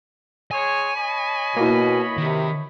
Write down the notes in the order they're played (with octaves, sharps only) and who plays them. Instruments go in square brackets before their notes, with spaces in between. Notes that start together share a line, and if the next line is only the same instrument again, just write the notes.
[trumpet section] G#3 G#4 C#5 [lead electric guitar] G#5
[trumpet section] C#5 D#5 B5
[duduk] B2 [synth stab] A#3 E4
[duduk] C3 [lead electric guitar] D#3